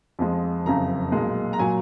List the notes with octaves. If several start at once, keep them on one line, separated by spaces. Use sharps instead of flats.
F2 F3 G#3
F#1 F2 C#3 A#5
B1 A#2 G#3
A#5
A#2 F#3 G#5